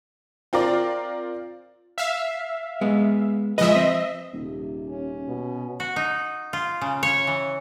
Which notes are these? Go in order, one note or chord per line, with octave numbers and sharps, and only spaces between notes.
C4 F4 A#4 D5
E5 F5
G#3 B3
F3 G#3 B4 D#5 E5
C4
D#1 C3
C#4
B2
F#4
D#4
F4
C#3
C#5
E3